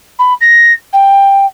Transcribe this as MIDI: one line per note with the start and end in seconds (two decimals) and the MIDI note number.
0.19 0.34 83
0.41 0.73 94
0.93 1.46 79